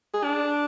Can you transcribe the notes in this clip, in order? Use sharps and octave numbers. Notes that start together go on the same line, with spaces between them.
G#4
D4